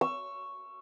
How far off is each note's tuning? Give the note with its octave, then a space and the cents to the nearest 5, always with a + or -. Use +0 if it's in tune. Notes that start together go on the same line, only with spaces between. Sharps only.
C#6 +0 E6 +25